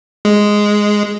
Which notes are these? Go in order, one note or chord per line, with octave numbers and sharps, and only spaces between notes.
G#3